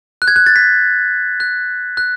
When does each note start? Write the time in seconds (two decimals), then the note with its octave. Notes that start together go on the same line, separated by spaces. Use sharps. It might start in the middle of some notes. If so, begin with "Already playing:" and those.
0.22 F#6
0.28 G#6
0.36 F#6
0.46 A6
0.56 B6
1.40 F#6
1.97 F#6